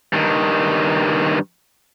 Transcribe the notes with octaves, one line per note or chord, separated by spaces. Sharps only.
G2 D#3